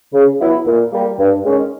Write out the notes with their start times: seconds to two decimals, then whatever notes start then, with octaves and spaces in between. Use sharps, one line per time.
0.13 C#3
0.40 F#3 B3 E4
0.66 A#2
0.91 G3 A#3
1.18 G2
1.44 D#3 G#3 C#4